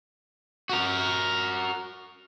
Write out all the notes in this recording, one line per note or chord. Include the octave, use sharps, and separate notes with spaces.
F#4 A#4